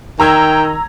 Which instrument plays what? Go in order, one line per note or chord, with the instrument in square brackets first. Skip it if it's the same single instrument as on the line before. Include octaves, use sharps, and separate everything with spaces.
[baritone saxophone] D#3 [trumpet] G5 [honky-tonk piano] A#5 E6 G#6